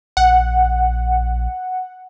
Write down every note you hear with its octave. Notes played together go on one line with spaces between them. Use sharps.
A#1 F#5